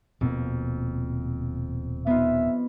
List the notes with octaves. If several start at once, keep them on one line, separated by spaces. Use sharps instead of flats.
D#1 F2 B2 A#3
B3 D#4 F4 E5